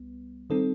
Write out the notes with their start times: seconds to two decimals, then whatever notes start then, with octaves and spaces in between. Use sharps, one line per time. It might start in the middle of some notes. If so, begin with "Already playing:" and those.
Already playing: C2 G3 B3
0.50 D#3 G3 C4 D#4 A4